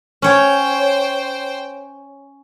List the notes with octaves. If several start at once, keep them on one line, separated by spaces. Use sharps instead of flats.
C#4 C5 C#5 G5